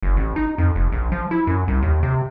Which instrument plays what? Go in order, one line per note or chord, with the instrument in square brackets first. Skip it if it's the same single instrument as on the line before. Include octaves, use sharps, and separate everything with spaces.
[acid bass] F#1
A1
D#4
F2
F1
A#1
F3
E4
F#2
C2
D#2
C3